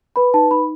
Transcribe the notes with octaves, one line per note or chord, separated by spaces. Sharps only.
B4 B5
D#4 A5
D#4 B5